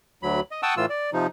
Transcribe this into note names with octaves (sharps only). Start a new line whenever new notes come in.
D2 F#3 B5
D#5
F#5 G5 A5 C#6 D#6 E6
A2 E3 F4 E6
D5
C3 F3 D#4